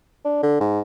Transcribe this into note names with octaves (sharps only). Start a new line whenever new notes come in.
D4
D3
G#2